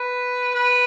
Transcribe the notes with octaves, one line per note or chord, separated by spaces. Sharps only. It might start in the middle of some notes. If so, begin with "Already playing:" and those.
Already playing: B4
B4